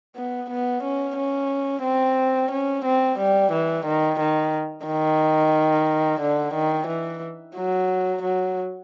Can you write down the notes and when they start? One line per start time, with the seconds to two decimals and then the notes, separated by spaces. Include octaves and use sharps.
0.16 B3
0.50 B3
0.84 C#4
1.17 C#4
1.84 C4
2.51 C#4
2.85 C4
3.19 G3
3.52 E3
3.86 D#3
4.20 D#3
4.86 D#3
6.21 D3
6.54 D#3
6.88 E3
7.56 F#3
8.23 F#3